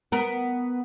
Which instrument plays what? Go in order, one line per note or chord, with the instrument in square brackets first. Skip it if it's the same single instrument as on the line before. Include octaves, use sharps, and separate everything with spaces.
[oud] B3 A#4